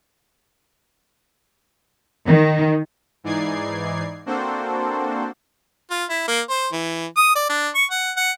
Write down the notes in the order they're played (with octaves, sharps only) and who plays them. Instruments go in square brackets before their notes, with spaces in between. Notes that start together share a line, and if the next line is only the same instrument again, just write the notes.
[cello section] D#3
[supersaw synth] G#2 E3 D#4 D5 G#6 C7
A#3 C4 D4 F#4 A4 C5
[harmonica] F4
E4
A#3
C5
E3
D#6
D5
D4
C#6
F#5
F#5